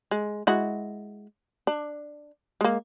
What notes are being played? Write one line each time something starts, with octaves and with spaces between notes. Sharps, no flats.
G#3
G#3 E4 F#4
D4
G#3 A#3